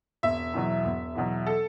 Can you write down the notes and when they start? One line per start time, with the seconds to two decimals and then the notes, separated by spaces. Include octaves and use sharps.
0.23 E1 E5
0.54 E2 B2 F#3
0.85 E1
1.15 E2 B2 F#3
1.46 A4